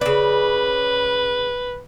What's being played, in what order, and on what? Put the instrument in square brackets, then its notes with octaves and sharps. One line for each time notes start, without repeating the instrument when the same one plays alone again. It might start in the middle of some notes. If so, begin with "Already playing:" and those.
[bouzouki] C#3 D5 [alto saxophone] B4